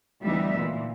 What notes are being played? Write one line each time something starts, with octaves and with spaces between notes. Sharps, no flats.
D2 E3 G3 B3 D#4 E5
A#2 E3